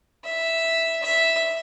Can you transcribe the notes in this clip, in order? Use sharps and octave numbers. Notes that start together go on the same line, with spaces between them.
E5
E5